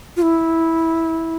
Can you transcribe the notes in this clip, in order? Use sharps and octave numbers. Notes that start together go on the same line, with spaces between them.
F4
E4